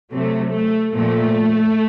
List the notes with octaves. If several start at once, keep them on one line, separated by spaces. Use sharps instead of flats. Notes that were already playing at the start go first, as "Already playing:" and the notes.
C3 F#3 A3
A3
A#2 F3 A3